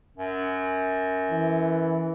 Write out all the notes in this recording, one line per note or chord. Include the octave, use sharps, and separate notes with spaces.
F#2
E3